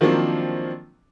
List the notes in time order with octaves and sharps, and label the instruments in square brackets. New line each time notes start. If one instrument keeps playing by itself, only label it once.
[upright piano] D#3 F3 F#3 A#3 C4 D4